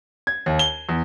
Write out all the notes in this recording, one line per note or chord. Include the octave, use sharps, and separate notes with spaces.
G#6
D#2
G7
E2